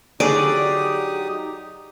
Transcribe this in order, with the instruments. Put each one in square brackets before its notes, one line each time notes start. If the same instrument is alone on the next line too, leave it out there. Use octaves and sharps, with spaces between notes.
[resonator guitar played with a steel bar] D3 F#3 G#4 [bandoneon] D#4 G4 D#6 [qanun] D5